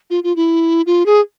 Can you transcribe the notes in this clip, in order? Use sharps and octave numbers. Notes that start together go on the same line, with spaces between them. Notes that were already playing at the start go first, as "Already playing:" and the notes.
F4
F4
E4
F4
G#4